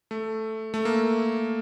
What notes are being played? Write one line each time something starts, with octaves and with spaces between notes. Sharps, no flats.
A3
A3
A#3